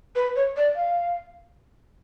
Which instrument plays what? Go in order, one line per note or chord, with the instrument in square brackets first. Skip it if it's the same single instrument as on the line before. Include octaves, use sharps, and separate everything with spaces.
[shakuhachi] B4
C#5
D5
F5